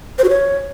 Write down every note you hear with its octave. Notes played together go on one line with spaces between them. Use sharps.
C5
F#4
C#5